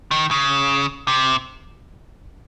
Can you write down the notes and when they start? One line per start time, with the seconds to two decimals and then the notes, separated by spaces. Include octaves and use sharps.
0.11 D#3
0.31 C#3
1.08 C3